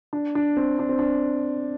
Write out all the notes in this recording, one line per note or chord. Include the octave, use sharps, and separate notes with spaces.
D4
D4
C4
D4
C4
D4